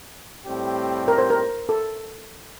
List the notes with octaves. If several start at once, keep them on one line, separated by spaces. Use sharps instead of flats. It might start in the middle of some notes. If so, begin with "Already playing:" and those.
A2 G3 C4 G4
A#4
C5
A#4
A4